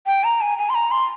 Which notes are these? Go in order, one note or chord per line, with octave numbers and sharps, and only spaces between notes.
G5
A#5
G#5
G#5
C6
A#5
C6